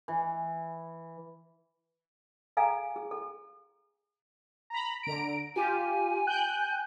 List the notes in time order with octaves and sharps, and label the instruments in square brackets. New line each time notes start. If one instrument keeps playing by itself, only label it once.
[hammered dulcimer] E3
[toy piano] G#4 A4 F5 G#5 A#5
G#4
A4
[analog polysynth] A#5 B5
D3 A#5 D7
[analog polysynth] F4 G4 [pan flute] G#5
[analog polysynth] G5 F#6 G6